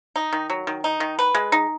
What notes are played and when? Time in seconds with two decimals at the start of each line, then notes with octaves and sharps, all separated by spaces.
0.16 D#4
0.33 D#3
0.50 F#3
0.67 D#3
0.84 D#4
1.00 D#3
1.19 B4
1.35 G#3
1.52 D#4